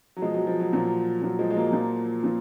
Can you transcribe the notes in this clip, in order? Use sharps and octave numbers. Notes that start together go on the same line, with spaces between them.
F#3
B2 F3 G#3
F#3
F3
F#3
A#2 F3 F#3
A#2 F3 F#3
F3 G#3
G#3
F#3 A#3
A#2 F3
A#2 F3